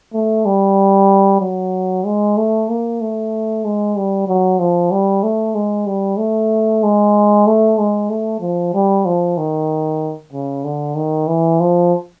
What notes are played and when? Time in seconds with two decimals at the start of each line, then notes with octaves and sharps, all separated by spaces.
0.14 A3
0.46 G3
1.40 F#3
2.05 G#3
2.37 A3
2.69 A#3
3.01 A3
3.64 G#3
3.96 G3
4.27 F#3
4.59 F3
4.91 G3
5.23 A3
5.55 G#3
5.87 G3
6.18 A3
6.83 G#3
7.46 A3
7.78 G#3
8.10 A3
8.41 F3
8.73 G3
9.05 F3
9.37 D#3
10.33 C#3
10.64 D3
10.96 D#3
11.27 E3
11.60 F3